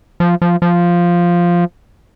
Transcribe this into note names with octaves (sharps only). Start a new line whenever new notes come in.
F3
F3
F3